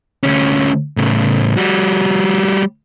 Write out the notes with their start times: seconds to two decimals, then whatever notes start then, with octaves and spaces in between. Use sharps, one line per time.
0.23 D2 C#4
0.97 A2 C#3
1.57 G3 F#4